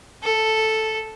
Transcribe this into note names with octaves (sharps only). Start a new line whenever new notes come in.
A4